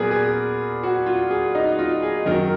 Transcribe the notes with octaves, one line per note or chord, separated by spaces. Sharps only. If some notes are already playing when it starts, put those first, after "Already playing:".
Already playing: A#2 F#3 B3 G#4 A#4 B4 D5
G#4
F#4
F4
G#4
D#4
F4
G#4
F#2 D#3 F#3 A#4